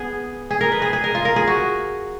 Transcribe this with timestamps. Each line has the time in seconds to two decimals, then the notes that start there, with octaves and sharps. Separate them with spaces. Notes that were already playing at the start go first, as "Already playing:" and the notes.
Already playing: B3 G#4
0.50 G#4
0.61 A#4
0.72 B4
0.82 G#4
0.93 G#4
1.04 A#4
1.15 F4
1.25 A#4
1.36 G#4
1.47 F#4